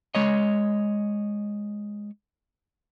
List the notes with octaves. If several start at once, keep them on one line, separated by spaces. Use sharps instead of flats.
G#3 C#5 D#5